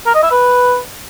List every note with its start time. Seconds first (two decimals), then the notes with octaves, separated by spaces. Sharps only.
0.06 A#4
0.15 D#5
0.23 E5
0.31 B4